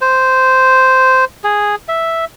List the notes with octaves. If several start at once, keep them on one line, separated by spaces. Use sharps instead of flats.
C5
G#4
E5